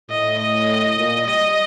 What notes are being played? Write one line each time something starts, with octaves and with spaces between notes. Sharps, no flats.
A2 D#5
D#5
A#2
G3 D#5